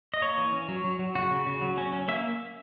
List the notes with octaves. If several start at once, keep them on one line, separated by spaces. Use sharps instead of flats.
D#5
A#3 C#5
E3
C#4
F#3
F#3
F#3
C#3 F#4
C#3
C#3
F#3
C#4
C#4
A#3 E5